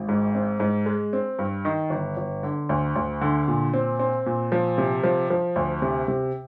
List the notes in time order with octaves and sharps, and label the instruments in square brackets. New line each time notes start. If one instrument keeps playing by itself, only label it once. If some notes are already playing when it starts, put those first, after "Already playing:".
Already playing: [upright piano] G#1
G#2
C4
G#2
G#3
C4
G2
D#3
G1
G1
D3
D2
D2
D3
A#2
C4
C4
A#2
F3
C3
F3
F3
D2
C3
C3